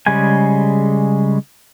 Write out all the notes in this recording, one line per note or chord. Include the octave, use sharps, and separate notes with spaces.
C#3 G3 G#3 G#5